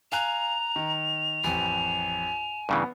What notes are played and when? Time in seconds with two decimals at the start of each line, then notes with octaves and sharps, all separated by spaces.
0.12 F5 G#5 A#5 F#6 F7
0.76 D#3
1.44 A1 F2 G#5
2.69 G2 C#3 E3 B3